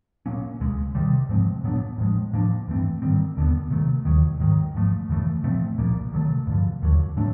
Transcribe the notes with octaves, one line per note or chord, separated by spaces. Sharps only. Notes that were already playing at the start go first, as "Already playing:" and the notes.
A#2 F#3 A#3 C#4
C#2 B2 G#3
C3 D#3 G3
G#2 F3 G#3 C4
A#2 F#3 B3 D4
A2 F3 G#3
A2 F3 A#3 D4
G2 E3 A3 C4
G#2 D#3 G3 C4
D#2 D3 F#3 B3
C3 D#3 F#3 A3
D#2 D#3 F#3
G#2 D#3 F#3
G#2 F3 A3
F#2 C#3 E3 A3
A#2 F3 A3 C4
C2 A#2 F3 A#3
C3 D#3 F#3 A3
G2 D3 F3
D#2 D3 F#3
A2 F#3 A3 D4